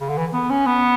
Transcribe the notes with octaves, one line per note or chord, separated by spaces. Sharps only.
C#3
D3
E3
B3
C#4
B3